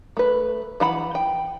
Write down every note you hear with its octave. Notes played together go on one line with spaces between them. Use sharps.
A3 B4
E3 F#5 B5
G5